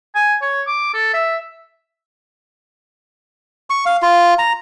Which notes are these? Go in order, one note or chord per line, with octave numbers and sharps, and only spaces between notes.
G#5
C#5
D6
A4
E5
C#6
F5
F4
A#5